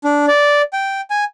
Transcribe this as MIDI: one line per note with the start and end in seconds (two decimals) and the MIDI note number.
0.04 0.26 62
0.28 0.62 74
0.73 1.01 79
1.10 1.24 80